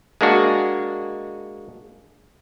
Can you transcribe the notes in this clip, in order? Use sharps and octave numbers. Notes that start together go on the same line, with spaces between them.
G#3 A#3 D4 F#4